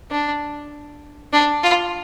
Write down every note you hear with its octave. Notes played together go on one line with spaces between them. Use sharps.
D4
D4
F4